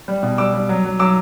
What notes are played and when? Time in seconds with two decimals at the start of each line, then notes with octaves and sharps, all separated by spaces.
0.08 G3
0.23 B2
0.38 G3 D6 E6
0.54 G3
0.69 F#3
0.84 F#3
0.99 F#3 D6 E6